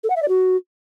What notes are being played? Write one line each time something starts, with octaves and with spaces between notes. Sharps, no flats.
A4
F#5
E5
D5
F#4